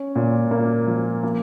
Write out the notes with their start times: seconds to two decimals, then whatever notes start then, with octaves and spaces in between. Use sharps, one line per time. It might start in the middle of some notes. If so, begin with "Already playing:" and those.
Already playing: C#4
0.16 A#2
0.51 A#3
0.87 F3
1.23 A#3